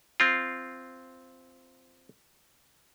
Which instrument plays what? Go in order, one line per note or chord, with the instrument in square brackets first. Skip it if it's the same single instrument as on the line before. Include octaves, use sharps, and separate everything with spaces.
[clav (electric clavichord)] C4 F4